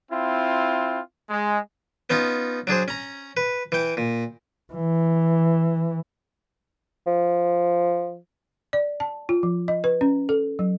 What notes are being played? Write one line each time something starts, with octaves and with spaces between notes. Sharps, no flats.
C4 E4 F4
G#3
B3 C#4 D#4 F4
F#3 D4 G#4 C5
C#4 A#5
B4
E3 G5
A#2
E3
F3
D5
A5
F4
F3
D#5
B4
C#4
A4
F#3